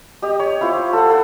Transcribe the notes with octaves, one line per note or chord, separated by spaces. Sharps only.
G4 D#5
C#5
E4 F4 C5
A4 F#5
A4 C5 F#5 C6